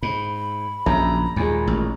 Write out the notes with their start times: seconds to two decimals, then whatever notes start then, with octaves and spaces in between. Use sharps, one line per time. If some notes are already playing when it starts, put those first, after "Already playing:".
0.03 G#2 B5
0.86 A#1 F#2 C#3 E5 A#5
1.36 D#2 A#2 D#3 G#3
1.67 A1